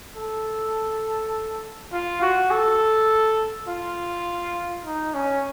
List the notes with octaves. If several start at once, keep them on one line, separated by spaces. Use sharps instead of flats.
A4
F4
F#4
A4
F4
D#4
C#4